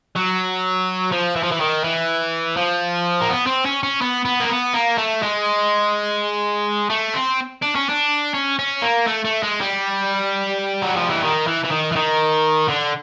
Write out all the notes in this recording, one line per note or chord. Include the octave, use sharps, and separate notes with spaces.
F#3
F3
E3
F3
E3
D#3
E3
F3
A#3
B3
C4
C#4
C#4
B3
B3
A#3
B3
A#3
A3
G#3
A3
C4
D4
C#4
D4
C#4
C#4
A#3
A3
A3
G#3
G3
F#3
F3
E3
D#3
E3
E3
D#3
E3
D#3
D3